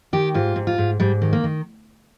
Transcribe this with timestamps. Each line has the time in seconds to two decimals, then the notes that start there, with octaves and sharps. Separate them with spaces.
0.13 D#3 G4
0.34 G#2 F4
0.56 G#2
0.67 F4
0.78 G#2
1.00 G#2 G3
1.22 D#3
1.33 A#3
1.44 D#3